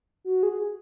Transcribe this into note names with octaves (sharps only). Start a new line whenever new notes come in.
F#4
G#4